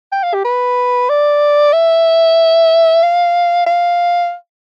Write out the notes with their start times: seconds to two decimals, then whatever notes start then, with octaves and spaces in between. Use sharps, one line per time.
0.12 G5
0.23 F5
0.34 G4
0.45 B4
1.10 D5
1.73 E5
3.03 F5
3.66 F5